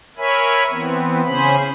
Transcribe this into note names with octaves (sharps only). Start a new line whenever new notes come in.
A#4 C#5 E5 G#5 B5
E3 B3 C4
C#3 C#4 G#4 C5 B5